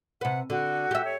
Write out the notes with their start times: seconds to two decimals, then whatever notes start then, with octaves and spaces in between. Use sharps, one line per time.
0.21 C3 B4 F#5
0.50 D3 F#4
0.91 G4 E5
1.04 C#5